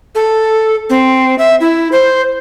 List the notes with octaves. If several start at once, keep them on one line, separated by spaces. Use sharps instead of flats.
A4
C4
E5
E4
C5